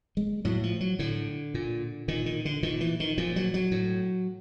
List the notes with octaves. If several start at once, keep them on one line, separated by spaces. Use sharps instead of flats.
G#3
A2 F#3
F3
F#3
A2 D3
A#2
A#2 D#3
D#3
D3
A#2 D#3
E3
D#3
A#2 F3
F#3
F#3
A2